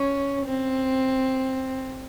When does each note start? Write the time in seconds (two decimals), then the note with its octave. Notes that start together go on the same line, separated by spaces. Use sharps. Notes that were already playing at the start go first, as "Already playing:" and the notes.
Already playing: C#4
0.46 C4